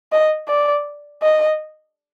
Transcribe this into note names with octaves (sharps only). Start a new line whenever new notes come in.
D#5
D5
D#5